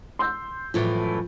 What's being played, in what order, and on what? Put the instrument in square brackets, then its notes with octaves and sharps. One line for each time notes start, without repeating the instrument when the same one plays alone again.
[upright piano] C6 E6 G6
[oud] F#2 A2 E3 [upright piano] F3